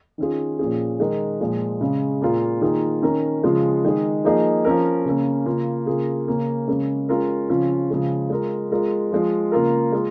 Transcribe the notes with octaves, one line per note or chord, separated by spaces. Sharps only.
D#3 C#4 F4 G#4
A#2 F3 C#4 G#4
D#3 G#3 D#4 A#4
A#2 F3 G#3
C#3 G#3 C#4
A#2 A#3 F4 G#4
D#3 A#3 F4 G#4
D#3 C#4 A#4
C#3 F3 G#3 F4
D#3 G#3 D#4 G#4
F3 A#3 D#4 G#4
F3 C#4 A#4
C#3 A#3 C#4
C#3 A#3 F4
C#3 A#3 F4 G#4
C#3 A#3 C#4
C#3 G#3 C#4 A#4
G#3 C#4 F4 A#4
C#3 F3 C#4 F4
C#3 F3 G#3 F4 G#4
G#3 F4 A#4
G#3 F4 A#4
F3 G#3 F4
C#3 A#3 F4 A#4
G#3 F4